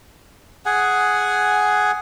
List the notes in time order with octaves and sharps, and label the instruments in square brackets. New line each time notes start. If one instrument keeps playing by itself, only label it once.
[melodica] G#4 F#5 G#5